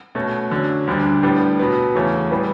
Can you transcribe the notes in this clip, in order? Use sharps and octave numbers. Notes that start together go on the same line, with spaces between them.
B2 A3 C#4 F#4
D3 F#3 C#4
D2 D3 G3 D4
A2 G3 B3 D4 G4
B2 F#3 B3
E2 C#3 E3 A3 C#4
A2 E3 G3 B3